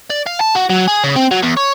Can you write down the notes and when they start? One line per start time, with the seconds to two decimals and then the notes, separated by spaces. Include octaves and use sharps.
0.10 D5
0.26 F5
0.40 A5
0.55 F#4
0.70 F#3
0.87 G#4
1.04 C#3
1.16 C4
1.31 F#3
1.43 E2
1.57 C#5